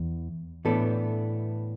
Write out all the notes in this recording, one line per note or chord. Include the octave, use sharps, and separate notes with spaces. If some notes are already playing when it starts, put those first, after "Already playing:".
Already playing: E2
A2 E3 B3 D4 A4